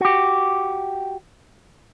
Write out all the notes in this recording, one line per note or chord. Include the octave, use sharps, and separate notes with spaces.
F#4 G4